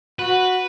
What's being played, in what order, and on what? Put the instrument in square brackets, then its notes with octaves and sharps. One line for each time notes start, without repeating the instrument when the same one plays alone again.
[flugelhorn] F#4 [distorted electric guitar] B4